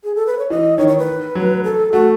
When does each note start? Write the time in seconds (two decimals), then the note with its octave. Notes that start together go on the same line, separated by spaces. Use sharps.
0.04 G#4
0.15 A4
0.26 B4
0.39 C#5
0.50 E3 D#5
0.78 D#3 C#5
0.88 C#5
0.98 B4
1.35 F#3
1.64 A4
1.92 A3 F#4